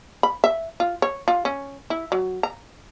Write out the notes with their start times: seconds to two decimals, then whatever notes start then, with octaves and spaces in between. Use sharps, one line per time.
0.23 B5
0.44 E5
0.80 F4
1.02 C#5
1.28 F4
1.45 C#4
1.90 E4
2.12 F#3
2.43 A#5